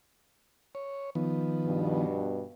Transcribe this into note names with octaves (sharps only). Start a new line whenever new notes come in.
C#5
D#3 F3 B3
G2 B2